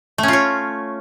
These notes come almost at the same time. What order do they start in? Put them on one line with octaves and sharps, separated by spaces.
A3 C#4 F4 C#5